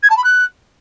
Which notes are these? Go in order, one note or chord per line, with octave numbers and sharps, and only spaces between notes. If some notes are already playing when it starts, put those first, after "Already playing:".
G#6
A5
B5
F#6